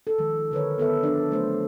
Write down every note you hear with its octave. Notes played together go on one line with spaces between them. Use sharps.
A4
D#3 F3 G#3
D3 A#4 B4 C#5
B3 A4 B4 E5
F3 D4 D5
F#3 A3 D4 C5